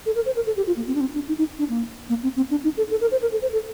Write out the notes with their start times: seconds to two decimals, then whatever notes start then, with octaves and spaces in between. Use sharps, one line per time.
0.06 A4
0.16 A#4
0.26 C5
0.36 A#4
0.46 A4
0.57 G4
0.67 F4
0.76 A#3
0.87 C4
0.95 D4
1.01 C4
1.14 D4
1.28 D#4
1.38 D#4
1.59 D4
1.69 A#3
2.09 A#3
2.23 C4
2.36 C4
2.51 D4
2.64 D#4
2.77 A4
2.91 A4
3.01 A#4
3.11 C5
3.22 A#4
3.32 A4
3.42 C5
3.53 A4